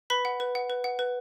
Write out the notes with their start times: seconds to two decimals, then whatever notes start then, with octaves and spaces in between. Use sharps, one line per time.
0.10 B4 B5 B6
0.25 F#5
0.40 B4
0.55 F#5
0.70 B4
0.84 F#5
0.99 B4